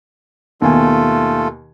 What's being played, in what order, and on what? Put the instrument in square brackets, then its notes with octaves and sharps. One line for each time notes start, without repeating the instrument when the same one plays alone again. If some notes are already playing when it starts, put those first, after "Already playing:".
[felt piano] D#2 B2 G#5 [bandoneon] A3 F4 A4